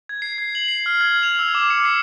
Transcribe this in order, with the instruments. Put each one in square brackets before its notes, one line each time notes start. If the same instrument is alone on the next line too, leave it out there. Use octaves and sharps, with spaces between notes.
[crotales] G#6
C7
G#6
F#7
C7
F6
G#6
F7
E6
D6
C#7
C7